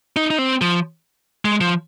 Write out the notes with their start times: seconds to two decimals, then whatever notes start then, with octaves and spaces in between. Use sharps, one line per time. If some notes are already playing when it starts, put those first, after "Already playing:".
0.16 D#4
0.30 D#4
0.38 C4
0.61 F3
1.45 G#3
1.61 F3